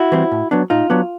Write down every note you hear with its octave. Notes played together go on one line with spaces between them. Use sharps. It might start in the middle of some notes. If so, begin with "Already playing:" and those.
Already playing: E4 F#4
E3 G3 C4
A2
F#3 B3 D4
A2 D#4 F4
F#3 B3 D4